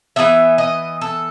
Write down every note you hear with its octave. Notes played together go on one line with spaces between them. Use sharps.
E3 G3 B3 E5
D#5
A4